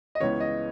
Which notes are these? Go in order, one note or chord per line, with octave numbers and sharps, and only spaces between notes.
D#5
C#2 C#3 E3 B3 C#5
D#5